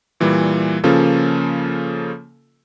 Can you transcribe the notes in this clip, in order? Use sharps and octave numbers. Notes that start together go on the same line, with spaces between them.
A#2 E3 G3
C#3 F3 A#3 C#4 F4 A4